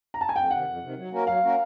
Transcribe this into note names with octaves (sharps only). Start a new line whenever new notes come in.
A#5
A5
G#5
F2 G5
C3 D#3 F#5
F2
C3 D#3
F#3
A#3 C#4 F#4 A#4
F#3 F5
A#3 C#4 F#4 A#4